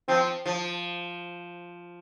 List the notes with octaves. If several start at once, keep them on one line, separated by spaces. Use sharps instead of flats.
F3 C4
F3